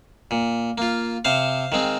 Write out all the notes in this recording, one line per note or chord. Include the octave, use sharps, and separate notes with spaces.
A#2
A#3 F4
C3 C5 F5
D#3 G#3 C4